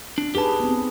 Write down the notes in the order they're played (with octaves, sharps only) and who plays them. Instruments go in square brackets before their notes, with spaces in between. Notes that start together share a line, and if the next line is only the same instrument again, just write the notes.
[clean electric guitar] D4
[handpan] D#4 G#4 B4 [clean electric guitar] G4 A5
[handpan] B3 C4